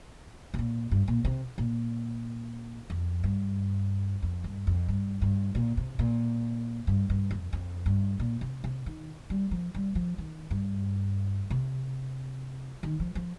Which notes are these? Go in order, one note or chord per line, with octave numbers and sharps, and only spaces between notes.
C3
A#2
G2
A#2
C3
A#2
F2
G2
F2
G2
F2
G2
G2
A#2
C3
A#2
G2
G2
F2
F2
G2
A#2
C3
C3
D#3
G3
F3
G3
F3
D#3
G2
C3
D#3
F3
F3